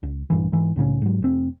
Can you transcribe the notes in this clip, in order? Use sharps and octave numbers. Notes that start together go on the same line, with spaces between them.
C#2
A#1 G2 E3
G#2 E3
C2 A2 C#3 C#4
G#2 F#3
F1 C4